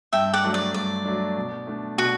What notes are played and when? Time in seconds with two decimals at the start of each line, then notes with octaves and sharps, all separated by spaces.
0.13 G2 E5 G5
0.33 D5 F#5
0.44 F#3 A3 D4
0.54 D5
0.74 G2 D5
1.05 F#3 A3 D4
1.37 B2
1.67 A3 D4
1.98 B2 F#4